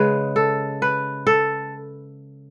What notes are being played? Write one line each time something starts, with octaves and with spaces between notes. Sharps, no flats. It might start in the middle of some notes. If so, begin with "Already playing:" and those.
Already playing: C#3 G#3 B4
A4
B4
A4